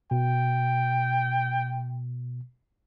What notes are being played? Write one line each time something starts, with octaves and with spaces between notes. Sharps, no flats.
B2 G5